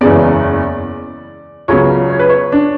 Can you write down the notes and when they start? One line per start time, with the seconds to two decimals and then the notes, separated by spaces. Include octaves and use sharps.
0.01 F#1 E2 C#3 G#3 B3 D5
1.68 C#2 C#3 F#3 B3 C#5
2.10 C#5
2.19 B4
2.29 C#5
2.52 D4